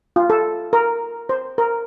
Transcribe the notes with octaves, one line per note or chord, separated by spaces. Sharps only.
F4
A4
A#4
C5
A#4